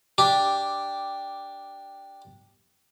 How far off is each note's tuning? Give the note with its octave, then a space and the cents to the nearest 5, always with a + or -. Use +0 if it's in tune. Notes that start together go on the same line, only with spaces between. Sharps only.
D4 +0 G4 +0